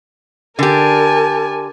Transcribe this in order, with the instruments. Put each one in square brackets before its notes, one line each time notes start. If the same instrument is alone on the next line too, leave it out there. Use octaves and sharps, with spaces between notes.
[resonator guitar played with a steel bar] D3 G4 [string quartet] A#4 G#5 A5